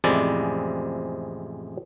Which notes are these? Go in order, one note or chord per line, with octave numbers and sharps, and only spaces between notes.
A1 F2 C3 G#3 E4 D5